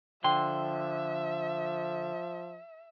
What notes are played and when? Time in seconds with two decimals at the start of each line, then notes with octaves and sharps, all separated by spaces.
0.24 D3 F3 E5 G5 C6